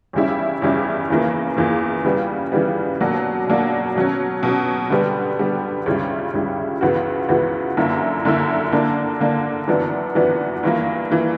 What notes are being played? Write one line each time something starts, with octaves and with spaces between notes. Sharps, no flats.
E2 C#3 G3 C#4 E4
E2 C#3 G3 C#4 E4
E2 C#3 E3 A#3
E2 C#3 E3 A#3
C#3 E3 G3 B3
C#3 E3 G3 B3
B2 F#3 A#3 D4 F#4
B2 F#3 A#3 D4 F#4
B2 F#3 C#4
B2 F#3 C#4
D3 G3 B3
D3 G3 B3
C#2 C#3 G3 C#4 E4
C#2 C#3 G3 C#4 E4
C#2 C#3 E3 B3 F#4
C#2 C#3 E3 B3 F#4
F#2 D3 A#3 E4
F#2 D3 A#3 E4
D3 A#3 D4
D3 A#3 D4
F#2 E3 B3 D4 F#4
F#2 E3 B3 D4 F#4
G2 E3 A#3
E3 A#3